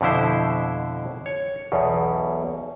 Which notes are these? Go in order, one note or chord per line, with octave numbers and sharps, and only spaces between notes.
F2 B2 D3 E4 C5
C#5
B1 E2 B2